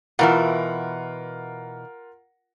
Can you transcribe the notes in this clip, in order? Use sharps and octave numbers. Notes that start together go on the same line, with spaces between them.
B2 E3 F4 A#4 E5 F#5